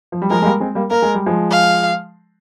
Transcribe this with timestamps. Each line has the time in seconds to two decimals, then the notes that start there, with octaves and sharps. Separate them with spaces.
0.12 F3
0.22 G3
0.30 F3 G#3 A#4
0.42 G#3
0.45 G3 A#3
0.60 G#3 C4
0.75 G3 A#3
0.91 A#3 A#4
1.02 G#3
1.15 G3
1.26 F3 G#3
1.51 F5